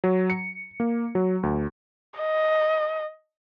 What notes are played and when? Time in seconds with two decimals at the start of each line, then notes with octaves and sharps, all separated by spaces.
0.04 F#3
0.30 C#7
0.80 A#3
1.15 F#3
1.43 D2
2.19 D#5